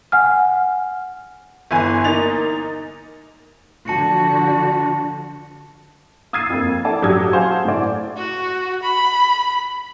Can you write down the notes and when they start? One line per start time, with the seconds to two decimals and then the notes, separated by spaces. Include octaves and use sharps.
0.12 F#5 G#5 F6
1.71 G1 E3 G#5
2.04 A#3 D#4 A6 F7
3.88 D3 F3 F#4 A5 C#7
6.33 D#6 E6 G#6 A6 C7 D#7
6.50 F2 A#3
6.85 A4 D5 A5
7.02 A1 F#3 G4 D#6 E6 G#6
7.32 G#4 C5 F5 F#5 A5
7.65 A2 D5
8.17 F#4
8.83 B5